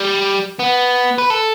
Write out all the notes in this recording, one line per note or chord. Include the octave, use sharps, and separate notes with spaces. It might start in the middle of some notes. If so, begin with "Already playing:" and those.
Already playing: G3
B3
B4
A4